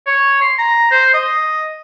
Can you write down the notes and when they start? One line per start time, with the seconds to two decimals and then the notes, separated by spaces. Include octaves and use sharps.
0.07 C#5
0.41 C6
0.59 A#5
0.91 C5
1.14 D#5